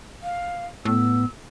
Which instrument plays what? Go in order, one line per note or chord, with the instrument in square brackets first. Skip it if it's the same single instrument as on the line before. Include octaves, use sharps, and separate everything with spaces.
[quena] F5
[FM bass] A2 [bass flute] B3 [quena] E6